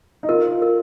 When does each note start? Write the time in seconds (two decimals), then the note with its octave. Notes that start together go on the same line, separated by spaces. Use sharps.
0.23 D#4
0.29 F4 A#4
0.62 A#4